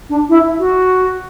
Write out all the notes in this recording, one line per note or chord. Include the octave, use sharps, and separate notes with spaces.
D4
E4
F#4